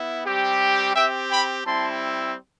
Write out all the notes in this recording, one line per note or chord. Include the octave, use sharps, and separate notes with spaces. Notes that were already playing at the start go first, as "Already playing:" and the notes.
Already playing: B3 E4
G3 C4 G4
C4 G4 E5 G5
G5 B5
G3 C4 E4 A5 C6